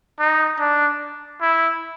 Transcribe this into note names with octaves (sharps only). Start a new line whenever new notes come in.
D#4
D4
E4